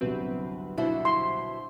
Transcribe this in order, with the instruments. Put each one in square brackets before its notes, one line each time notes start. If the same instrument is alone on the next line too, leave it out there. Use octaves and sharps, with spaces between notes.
[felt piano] G1 C2 F#3 [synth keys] C4 B4
[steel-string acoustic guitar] B2 E4 F#4 [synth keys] D4 C5
[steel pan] C6